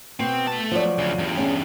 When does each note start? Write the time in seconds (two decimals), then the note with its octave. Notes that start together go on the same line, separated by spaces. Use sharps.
0.20 B2 C4
0.47 A3 A5
0.71 F3 F#3 D5
0.98 D2 C#3
1.19 E2 G2
1.37 C#4 D4 G#4